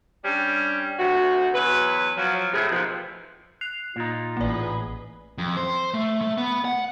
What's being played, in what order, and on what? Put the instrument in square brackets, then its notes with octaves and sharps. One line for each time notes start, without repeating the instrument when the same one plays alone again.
[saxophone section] G3 C#4 D4
D2 C3 F#4
E2 F#3 B4
F3 F#3
A2 C3 G#3 E4 G#4
D#2 B2 F3
[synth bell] F#6 C7 F7
[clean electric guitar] A#2 D#4 [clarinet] F4
[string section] A1 G#4 B4 [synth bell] A#3 D5
[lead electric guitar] F2
C5
A3
A3
B3
F#5